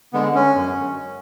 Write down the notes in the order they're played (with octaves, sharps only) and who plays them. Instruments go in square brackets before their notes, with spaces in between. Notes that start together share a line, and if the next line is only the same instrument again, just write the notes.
[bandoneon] D3 G#3 B3
C#4
F#2